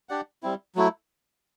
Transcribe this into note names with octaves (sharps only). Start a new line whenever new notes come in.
D4 G4 D5 F#5
G3 C4 E4
F#3 A3 E4